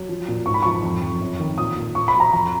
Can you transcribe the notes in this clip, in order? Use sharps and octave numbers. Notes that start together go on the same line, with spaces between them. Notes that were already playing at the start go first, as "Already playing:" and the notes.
Already playing: F#3
F3
A#2
G#2 C#6
B5
F3 C#6
F2
F2
F#2
D#3
A#2 D#6
A#2
A#2 C#6
B5
F#3
A#5
F2 A#5